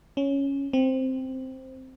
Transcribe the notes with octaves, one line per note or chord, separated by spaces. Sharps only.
C#4
C4